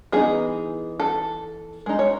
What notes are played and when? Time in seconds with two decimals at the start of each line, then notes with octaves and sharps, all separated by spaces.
0.12 E3 B3 D#4 G#4
1.00 A4
1.86 G#3 D#4
1.99 C#5